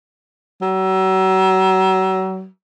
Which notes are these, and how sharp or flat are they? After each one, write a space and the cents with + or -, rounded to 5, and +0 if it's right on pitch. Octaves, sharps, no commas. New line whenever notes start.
F#3 +35